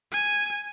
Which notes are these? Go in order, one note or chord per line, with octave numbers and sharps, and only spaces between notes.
G#5